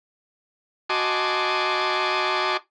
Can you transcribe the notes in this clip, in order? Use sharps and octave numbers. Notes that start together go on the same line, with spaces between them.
F#4 D#5 G#5 A5 C6 D6